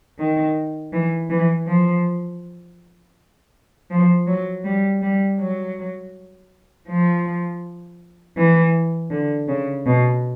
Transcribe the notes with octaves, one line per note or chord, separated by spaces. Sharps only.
D#3
E3
E3
F3
F3
F#3
G3
G3
F#3
F3
E3
D3
C#3
B2